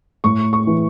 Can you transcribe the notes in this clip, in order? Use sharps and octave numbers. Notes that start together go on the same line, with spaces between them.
A2 C#6
C#6
E3